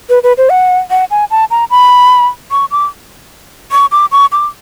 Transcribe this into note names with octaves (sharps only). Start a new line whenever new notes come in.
B4
B4
C5
F#5
F#5
G#5
A5
A#5
B5
C#6
D6
C#6
D6
C#6
D6